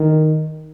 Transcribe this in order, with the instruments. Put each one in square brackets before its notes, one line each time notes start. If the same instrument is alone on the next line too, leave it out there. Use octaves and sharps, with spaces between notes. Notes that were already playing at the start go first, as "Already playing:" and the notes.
Already playing: [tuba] D#3